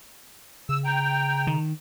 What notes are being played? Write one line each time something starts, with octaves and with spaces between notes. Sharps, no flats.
C#3 E6
G5 A#5
D#3